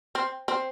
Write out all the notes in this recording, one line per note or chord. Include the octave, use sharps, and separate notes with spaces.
C4
C4